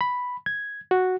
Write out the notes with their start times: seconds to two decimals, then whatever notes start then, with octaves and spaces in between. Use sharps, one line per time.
0.01 B5
0.46 G#6
0.91 F#4